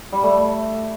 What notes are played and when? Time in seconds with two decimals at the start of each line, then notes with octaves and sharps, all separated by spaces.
0.12 G3
0.23 A3